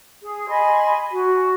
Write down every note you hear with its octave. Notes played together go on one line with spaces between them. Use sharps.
G#4
D#5 G#5 B5 C6
F#4